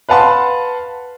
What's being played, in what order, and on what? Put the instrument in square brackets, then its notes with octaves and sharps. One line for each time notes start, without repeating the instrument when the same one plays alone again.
[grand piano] B4 F5 F#5 A5 B5 C6